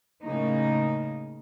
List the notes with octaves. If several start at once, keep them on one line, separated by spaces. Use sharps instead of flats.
A2 C#3 A#3 D#4